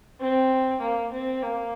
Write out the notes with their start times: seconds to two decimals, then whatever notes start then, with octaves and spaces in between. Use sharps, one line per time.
0.21 C4
0.81 A#3
1.12 C4
1.42 A#3